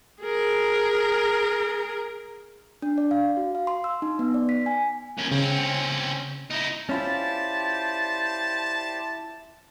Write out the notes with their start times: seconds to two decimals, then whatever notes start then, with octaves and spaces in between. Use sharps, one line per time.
0.23 G#4 A#4
2.82 D4
2.98 D5
3.11 F5
3.37 F#4
3.55 F5
3.67 C6
3.84 E6
4.02 D#4
4.19 B3
4.34 D5
4.49 B6
4.66 G#5
5.17 D#2 C#4
5.32 C#3 C4 C#4
6.51 D#4 E4
6.89 C#4 E4 F4 G4 C5 D5 A5